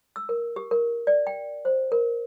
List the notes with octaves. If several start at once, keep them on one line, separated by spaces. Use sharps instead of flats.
E6
A#4
G4
A#4
D5
G5
C5
A#4